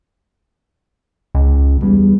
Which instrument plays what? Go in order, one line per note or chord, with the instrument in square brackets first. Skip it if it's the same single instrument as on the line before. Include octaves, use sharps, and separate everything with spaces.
[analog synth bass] C#2
[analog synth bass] E2 [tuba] G3